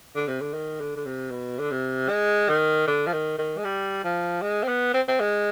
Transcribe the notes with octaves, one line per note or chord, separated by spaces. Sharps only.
D3
C3
D3
D#3
D3
D3
C3
B2
D3
C3
G#3
D#3
D3
F3
D#3
D#3
G#3
G3
F3
G#3
C4
B3
C4
C4
G#3